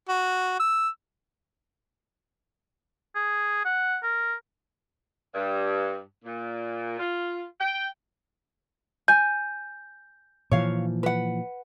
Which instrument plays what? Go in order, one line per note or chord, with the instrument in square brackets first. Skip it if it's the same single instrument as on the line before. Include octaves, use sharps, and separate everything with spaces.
[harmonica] F#4
E6
[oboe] G#4
F#5
A#4
[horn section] G2
A#2
F4
G5
[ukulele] G#5 [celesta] G6
[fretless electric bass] A#2 E3 F3 [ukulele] C#5 F5
[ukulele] B4 F#5